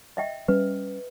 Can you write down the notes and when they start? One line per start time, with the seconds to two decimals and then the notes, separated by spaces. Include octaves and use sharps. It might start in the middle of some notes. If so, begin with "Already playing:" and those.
0.17 D#5 E5 G5
0.48 G3 C#4 B4